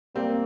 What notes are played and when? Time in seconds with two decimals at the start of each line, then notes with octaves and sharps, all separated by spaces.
0.15 G3 A#3 C4